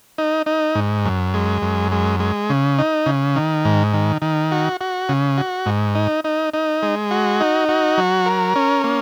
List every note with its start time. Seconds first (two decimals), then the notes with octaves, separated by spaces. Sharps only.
0.18 D#4
0.46 D#4
0.75 G#2
1.05 F#2
1.34 G#3
1.62 F#2
1.92 G#3
2.20 G#3
2.50 C#3
2.79 D#4
3.06 C#3
3.36 D#3
3.65 G#2
3.93 D#3
4.22 D#3
4.52 F#4
4.81 F#4
5.09 C#3
5.38 F#4
5.66 G#2
5.95 D#4
6.24 D#4
6.54 D#4
6.83 G#3
7.11 F#4
7.40 D#4
7.69 F#4
7.98 F#3
8.26 A#4
8.56 C#4
8.84 A#3